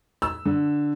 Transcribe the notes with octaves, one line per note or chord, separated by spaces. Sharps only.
E6
D3